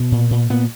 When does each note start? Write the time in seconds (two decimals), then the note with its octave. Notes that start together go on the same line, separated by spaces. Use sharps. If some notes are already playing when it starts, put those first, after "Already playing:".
Already playing: B2
0.12 A#2
0.31 A#2
0.50 A#2 B3